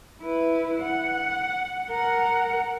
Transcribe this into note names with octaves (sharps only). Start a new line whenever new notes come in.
E4 B4
F#5
A#4 F#5